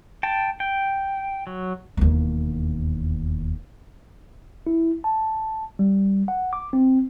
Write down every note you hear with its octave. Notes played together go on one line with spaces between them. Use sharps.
G5 A5
G5
F#3
E1 D#2
E4
A5
G3
F#5
D6
C4